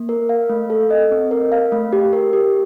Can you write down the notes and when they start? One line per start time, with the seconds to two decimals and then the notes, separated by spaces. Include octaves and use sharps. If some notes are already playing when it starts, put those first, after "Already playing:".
Already playing: A#3
0.09 A#4
0.29 F5
0.49 A3
0.70 A4
0.90 D#5
1.11 C4
1.31 A#4
1.52 F5
1.72 A3
1.93 G4
2.13 A#4
2.33 G4